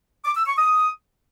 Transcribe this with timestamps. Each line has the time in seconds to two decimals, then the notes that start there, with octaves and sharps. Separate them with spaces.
0.24 D6
0.36 E6
0.47 C#6
0.58 D#6